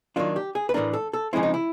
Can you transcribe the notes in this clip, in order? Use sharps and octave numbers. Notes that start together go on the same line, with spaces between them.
D#3 F#3 A#3 D4 F4
G4
G#4
B4
A2 E3 A3 D4 A#4
A4
A4
C#3 F3 G#3 C4 E4
D#4
E4